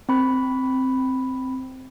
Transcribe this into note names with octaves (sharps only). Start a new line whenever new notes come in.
C4 B5